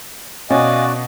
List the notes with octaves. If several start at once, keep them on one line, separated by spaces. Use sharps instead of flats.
B2 C#4 F#4 D5 D#5 F5 G#5